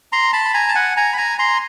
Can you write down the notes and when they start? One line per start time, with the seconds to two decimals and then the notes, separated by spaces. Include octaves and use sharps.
0.12 A#5 C6
0.33 A5 B5
0.45 B5
0.54 G#5 A#5
0.68 A5
0.75 F#5 G#5
0.97 G#5 A#5
1.13 B5
1.18 G#5 A#5
1.38 A#5 C6